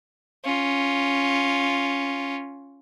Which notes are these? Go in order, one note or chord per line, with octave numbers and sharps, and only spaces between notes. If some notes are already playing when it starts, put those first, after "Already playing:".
C#4 F4